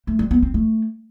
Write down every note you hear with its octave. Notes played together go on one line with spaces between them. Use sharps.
A3
G3
B3
C4
A3